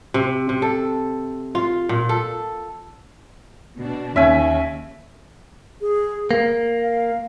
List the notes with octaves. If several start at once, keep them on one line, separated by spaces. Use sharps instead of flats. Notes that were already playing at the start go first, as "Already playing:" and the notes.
C3
C3
A4
F4
A#2
A4
B2 D4
D#2 D#3 C#4 E5 G#5
G#4
A#3 F5
F5